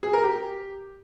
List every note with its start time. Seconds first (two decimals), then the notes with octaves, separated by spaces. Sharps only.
0.03 G#4
0.13 A#4
0.24 G4